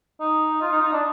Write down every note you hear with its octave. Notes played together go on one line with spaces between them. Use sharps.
D#4
F4
D#4
D#4
D4